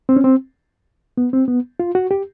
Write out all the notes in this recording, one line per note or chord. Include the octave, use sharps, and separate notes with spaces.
C4
C#4
C4
B3
C4
B3
F4
F#4
G4